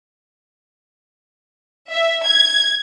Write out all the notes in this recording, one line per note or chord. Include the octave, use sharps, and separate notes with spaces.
E5
G#6